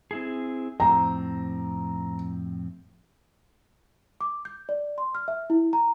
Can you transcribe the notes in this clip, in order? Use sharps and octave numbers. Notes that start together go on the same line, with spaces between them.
C4 E4 G#4
F2 A2 C4 A#5
D6
G6
D5
C6
F6
E5
E4
A#5